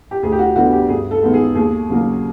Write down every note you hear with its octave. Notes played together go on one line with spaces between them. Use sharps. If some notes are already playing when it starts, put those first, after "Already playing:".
G4
D2 G#4
G4
F#4
D3 G3 B3 F#4
G4
G2 G#4
A4
D#3 G#3 B3
G#4
D#2 G#4
C#3 F#3 A#3